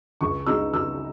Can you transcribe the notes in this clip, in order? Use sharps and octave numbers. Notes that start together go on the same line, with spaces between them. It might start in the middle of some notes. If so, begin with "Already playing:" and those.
C#2 C#6
C#3 G#3 D#4 E6
C#2 E6